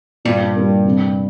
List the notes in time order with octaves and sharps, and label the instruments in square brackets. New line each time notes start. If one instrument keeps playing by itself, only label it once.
[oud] G2 [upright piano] A#2
[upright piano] G3 A#3
C3